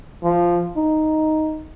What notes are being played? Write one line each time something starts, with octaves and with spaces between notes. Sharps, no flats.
F3
D#4